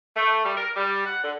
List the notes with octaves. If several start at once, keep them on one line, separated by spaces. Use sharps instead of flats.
A3
G3
A#4
G3
F#5
D3